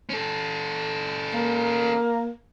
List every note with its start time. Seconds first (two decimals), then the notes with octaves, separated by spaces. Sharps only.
0.09 C#4 A4
1.34 A#3